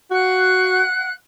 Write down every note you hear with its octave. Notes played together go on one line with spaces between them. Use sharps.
F#4 F5 F#5 F#6